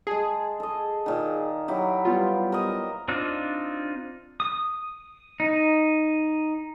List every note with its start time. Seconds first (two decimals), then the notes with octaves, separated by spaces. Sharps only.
0.07 G#3 G#4 A5
0.60 A4 D#5
1.06 A#2 D#3
1.68 F#3 E4 G4
2.05 G3 B3 F4
2.52 A#4 C5 D#5
3.08 C4 D4 D#4 F4
4.40 D#6
5.40 D#4